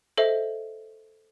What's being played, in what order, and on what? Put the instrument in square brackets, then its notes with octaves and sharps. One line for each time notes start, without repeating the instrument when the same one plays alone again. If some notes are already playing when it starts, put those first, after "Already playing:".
[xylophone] A4 C5 D#5 E5